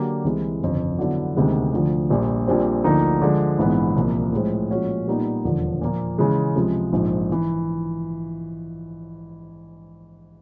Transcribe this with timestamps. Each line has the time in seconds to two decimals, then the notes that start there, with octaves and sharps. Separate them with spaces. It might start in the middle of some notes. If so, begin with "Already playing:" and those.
Already playing: D3 F#3 A#3 D4 G4
0.24 C2 C3 E3 G#3
0.62 G1 F2 C#3
0.99 D3 F#3 B3 E4
1.35 D2 C3 D#3 G#3 B3
1.73 D2 D3 F3
2.10 A#1 A#2 G3
2.47 A#1 A#2 G3 C4
2.84 D2 D3 F3 A#3 D#4
3.22 D3 F3 G#3
3.59 A#1 G#2 E3 G#3 B3
3.96 C2 A#2 F3 A#3
4.33 A2 F3 G#3 C4
4.71 A#2 F3 G#3 C#4 F#4
5.07 A#2 G3 B3 D#4
5.44 E1 D#2 D3 F3
5.81 A#2 F3 A#3
6.18 C#3 E3 G#3
6.56 C#2 C3 F3 G#3
6.93 A#1 G#2 F3
7.32 E3